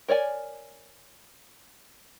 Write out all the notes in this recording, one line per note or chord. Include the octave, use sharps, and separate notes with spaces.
A#4 C#5 D5 G#5